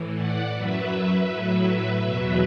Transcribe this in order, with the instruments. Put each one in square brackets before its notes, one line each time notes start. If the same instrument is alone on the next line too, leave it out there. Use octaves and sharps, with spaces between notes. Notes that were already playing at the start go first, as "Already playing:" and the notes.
Already playing: [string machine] A2 E3
D5 F#5
F#2 F#3 B4 E5
A2 F#3
E2 B2 F#3